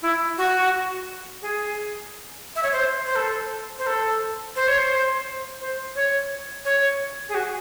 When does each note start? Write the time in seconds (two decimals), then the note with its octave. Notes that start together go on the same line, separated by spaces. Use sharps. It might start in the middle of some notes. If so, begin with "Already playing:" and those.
0.02 E4
0.38 F#4
1.42 G#4
2.56 E5
2.63 C#5
2.73 C5
3.06 C5
3.16 A4
3.79 C5
3.87 A4
4.56 C5
4.68 C#5
4.78 C5
5.61 C5
5.95 C#5
6.65 C#5
7.29 G#4
7.35 F#4